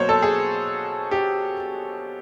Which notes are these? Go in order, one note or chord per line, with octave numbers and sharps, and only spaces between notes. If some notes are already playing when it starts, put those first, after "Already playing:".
Already playing: B2 F#3 A#3 C5 C#5
A4
G#4
G4